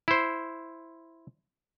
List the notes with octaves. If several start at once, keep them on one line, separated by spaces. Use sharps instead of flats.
E4 C5